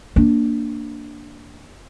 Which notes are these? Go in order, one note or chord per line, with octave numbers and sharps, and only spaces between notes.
A#3 D4